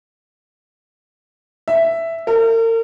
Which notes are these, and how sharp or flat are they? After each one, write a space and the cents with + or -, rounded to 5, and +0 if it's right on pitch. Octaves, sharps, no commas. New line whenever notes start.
E5 +5
A#4 -40